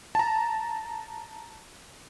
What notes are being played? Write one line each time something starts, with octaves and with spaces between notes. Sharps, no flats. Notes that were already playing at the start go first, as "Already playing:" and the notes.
A5 A#5